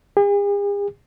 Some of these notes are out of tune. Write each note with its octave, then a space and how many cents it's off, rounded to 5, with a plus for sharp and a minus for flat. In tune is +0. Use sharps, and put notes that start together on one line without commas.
G#4 -45